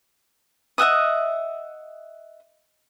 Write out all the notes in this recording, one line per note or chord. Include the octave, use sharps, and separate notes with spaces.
D#5 E5 F#5 D#6